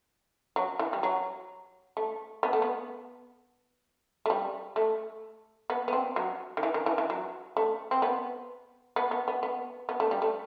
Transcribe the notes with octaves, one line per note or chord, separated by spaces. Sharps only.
F#3
E3
G3
F#3
A3
B3
A3
B3
A3
G3
A3
B3
B3
C4
F#3
D#3
E3
D#3
E3
E3
F#3
A3
C4
B3
B3
B3
B3
B3
B3
A3
G3
A3